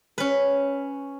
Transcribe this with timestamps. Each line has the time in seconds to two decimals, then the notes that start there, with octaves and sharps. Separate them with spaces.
0.18 C#4 B4